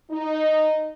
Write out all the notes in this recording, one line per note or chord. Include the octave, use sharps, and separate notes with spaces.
D#4